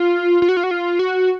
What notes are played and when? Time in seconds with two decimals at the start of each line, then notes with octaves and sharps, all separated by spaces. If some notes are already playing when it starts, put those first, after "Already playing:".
Already playing: F4
0.42 F4
0.49 F#4
0.57 F4
0.64 F#4
0.71 F4
0.99 F#4